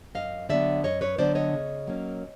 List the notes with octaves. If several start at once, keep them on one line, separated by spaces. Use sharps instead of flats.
F#2 D#5 F5
D3 F#3 B3 D5 E5
F#2 C#5 D#5
B4 C#5
D3 F#3 B3 C5 D5
C#5 D#5
C#3
F#3 A#3 C#4